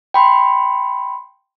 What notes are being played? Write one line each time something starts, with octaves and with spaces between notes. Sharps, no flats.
G5 B5 C6